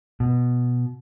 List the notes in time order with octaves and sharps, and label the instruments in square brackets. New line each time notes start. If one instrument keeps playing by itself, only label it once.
[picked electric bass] B2